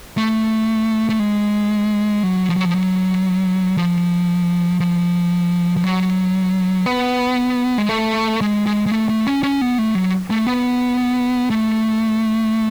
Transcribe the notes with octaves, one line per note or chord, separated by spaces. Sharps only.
A3
A3
G#3
F#3
F3
F#3
F3
F#3
F3
F3
F3
F#3
B3
G#3
A3
G#3
G#3
G#3
A3
A3
C#4
C#4
B3
A3
F#3
A3
B3
A3